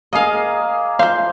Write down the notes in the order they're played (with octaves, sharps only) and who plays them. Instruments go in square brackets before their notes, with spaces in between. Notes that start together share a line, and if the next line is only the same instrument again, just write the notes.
[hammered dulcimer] A#3 G#4 [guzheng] D#5 F5
[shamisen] F3 F5 [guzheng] C5